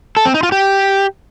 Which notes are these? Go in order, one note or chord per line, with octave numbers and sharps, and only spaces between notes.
A4
C4
D#4
F4
G4